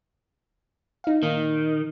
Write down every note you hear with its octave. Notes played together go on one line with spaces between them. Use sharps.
D#4 F5
A#2 D#3